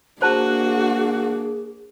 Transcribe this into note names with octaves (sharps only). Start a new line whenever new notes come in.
A#3 D4 F#4 G#4 C5 A5